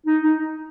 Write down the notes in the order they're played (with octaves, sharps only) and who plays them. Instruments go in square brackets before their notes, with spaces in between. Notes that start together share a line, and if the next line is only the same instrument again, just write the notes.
[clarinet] D#4
D#4